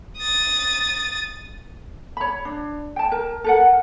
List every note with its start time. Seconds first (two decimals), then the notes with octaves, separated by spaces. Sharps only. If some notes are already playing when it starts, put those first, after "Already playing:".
0.17 D#6 A6
2.17 C#5 B5
2.45 D4
2.96 G5 A5
3.12 A#4
3.44 A4 A#4 F#5